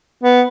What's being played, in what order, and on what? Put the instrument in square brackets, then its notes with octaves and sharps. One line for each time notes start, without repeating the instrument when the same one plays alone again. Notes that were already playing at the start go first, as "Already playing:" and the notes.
[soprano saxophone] B3